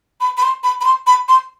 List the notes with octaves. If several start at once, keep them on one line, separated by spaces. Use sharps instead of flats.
B5
B5
C6
B5
B5
C6
B5
C6